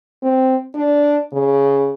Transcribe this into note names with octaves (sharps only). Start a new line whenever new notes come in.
C4
D4
C#3